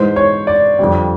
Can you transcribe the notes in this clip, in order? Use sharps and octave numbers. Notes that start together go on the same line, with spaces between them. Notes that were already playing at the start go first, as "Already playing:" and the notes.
Already playing: G#2 E3 G#3 C5
C#5
D5
F2 D3 G3